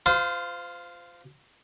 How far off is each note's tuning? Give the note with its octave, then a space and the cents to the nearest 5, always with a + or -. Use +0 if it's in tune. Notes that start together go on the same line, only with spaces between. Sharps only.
F4 +0 C5 -30